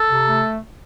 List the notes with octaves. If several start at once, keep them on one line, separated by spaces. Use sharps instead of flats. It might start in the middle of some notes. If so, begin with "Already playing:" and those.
Already playing: A4
C3
A3